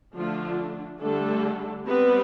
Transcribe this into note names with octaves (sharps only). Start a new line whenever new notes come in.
D3 F3 A3 D4 F4
D3 G3 A3 D4 A4
G3 B3 C4 B4